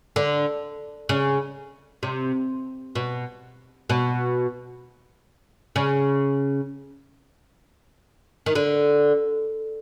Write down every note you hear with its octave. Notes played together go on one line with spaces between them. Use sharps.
D3
C#3
C3
B2
B2
C#3
D#3
D3